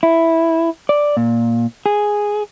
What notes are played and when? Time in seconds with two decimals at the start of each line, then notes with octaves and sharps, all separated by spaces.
0.03 E4
0.89 D5
1.17 A#2
1.86 G#4